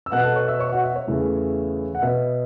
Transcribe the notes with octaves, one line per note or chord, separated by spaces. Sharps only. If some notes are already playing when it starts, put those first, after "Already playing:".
E6
B2 B3 F#5 F#6
A4 A5
C#5 C#6
E5 E6
C#5 C#6
F#4 F#5
E5
C#5
E2 C#3 E3 A3
F#5
B2 B3 E5